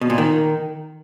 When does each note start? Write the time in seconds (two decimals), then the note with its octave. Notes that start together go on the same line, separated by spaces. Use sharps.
0.01 B2
0.10 A#2
0.18 D#3